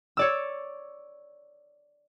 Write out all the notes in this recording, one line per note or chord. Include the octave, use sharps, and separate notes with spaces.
C#5 D5 E6